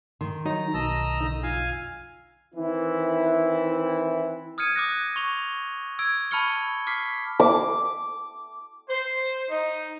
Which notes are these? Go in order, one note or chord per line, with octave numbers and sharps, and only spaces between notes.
D#3 C6
F3 F#3 D#4 A#5
B1 D#5 A5 A#5 E6
D3 D#4
F2 F4 F5 G#5 E6
D#3 E3 C4 E4
D#6 F6 G#6 C#7 D#7
D6 D#6 F#6 A#6
C#6 F7 G7
E6 G#6 D7
A5 B5 C#6 F6 C#7 G7
D6 F6 B6 C7
D6
C5
D#4